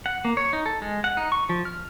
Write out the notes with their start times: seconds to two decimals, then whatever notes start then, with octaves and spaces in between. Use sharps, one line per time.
0.06 F#5
0.25 A#3
0.37 C#5
0.53 D#4
0.66 A4
0.82 G#3
1.04 F#5
1.17 D#4
1.32 C#6
1.49 F3
1.65 F6